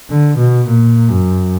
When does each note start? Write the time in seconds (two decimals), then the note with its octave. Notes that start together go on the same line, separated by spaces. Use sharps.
0.10 D3
0.38 B2
0.67 A#2
1.10 F#2